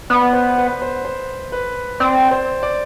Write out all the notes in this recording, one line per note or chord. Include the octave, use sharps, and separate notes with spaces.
B3 D5
C5
B4
C5
C5
B4
C4 D5
C5
D5